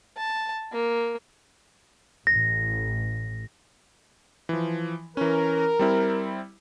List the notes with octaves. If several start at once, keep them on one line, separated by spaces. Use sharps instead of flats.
A5
A#3
A1 A#6
E3 F3
E3 C#4 A#4
G3 C4 E4